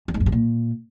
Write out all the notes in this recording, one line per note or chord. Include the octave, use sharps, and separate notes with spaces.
E2
G#2
F#2
C3
A#2